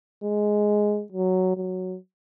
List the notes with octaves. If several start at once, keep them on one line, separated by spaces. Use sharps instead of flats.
G#3
F#3
F#3